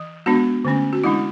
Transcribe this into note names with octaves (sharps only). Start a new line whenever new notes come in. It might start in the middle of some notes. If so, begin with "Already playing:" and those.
Already playing: E3
G#3 B3 D4 F#4
D3 A3 C#4
F#4
E3 G#3 D4 E4